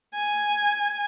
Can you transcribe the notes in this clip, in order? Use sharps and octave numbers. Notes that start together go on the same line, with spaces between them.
G#5